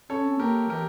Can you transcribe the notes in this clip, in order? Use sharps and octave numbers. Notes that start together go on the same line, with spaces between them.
C#4 A4 C#5
C#4
A#3 G4 A#4
E3 G4 A#4